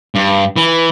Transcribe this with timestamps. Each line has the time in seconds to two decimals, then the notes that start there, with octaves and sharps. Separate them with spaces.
0.15 G2
0.56 E3